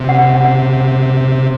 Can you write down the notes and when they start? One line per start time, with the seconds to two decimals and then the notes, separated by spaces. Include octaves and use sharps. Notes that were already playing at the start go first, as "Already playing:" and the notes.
Already playing: C3
0.09 F#5
0.35 F#5